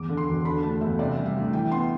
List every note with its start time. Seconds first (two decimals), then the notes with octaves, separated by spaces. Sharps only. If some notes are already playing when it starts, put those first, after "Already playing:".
Already playing: E2 D6
0.09 D3
0.17 C6
0.28 E1
0.45 D3 B5
0.62 A3 A5
0.81 E2 E5
0.99 C3 D5
1.17 G3
1.26 E5
1.35 D2
1.53 E3 G5
1.71 B3 C6